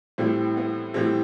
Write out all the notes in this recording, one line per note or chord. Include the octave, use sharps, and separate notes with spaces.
A2 E3 G3 C4
B3
A2 E3 G3 C4